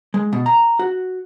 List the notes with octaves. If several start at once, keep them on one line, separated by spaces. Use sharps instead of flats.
G#3
B2
A#5
F#4